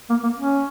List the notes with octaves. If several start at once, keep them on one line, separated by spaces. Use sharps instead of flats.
A#3
A#3
C#4